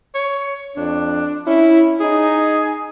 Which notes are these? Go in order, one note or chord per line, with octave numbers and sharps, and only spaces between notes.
C#5
F2 D4
C#4 E4
D#4 G#4